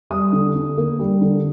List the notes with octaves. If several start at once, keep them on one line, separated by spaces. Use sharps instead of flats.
G3 D#6
D3
D3
A#3
G3
D3